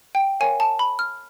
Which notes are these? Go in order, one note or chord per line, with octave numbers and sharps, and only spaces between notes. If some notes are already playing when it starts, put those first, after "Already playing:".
G5
A#4 C#5 F5 G#5
A5
B5
F6